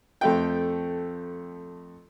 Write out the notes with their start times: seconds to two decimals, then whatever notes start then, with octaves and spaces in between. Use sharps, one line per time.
0.21 F2 A3 G5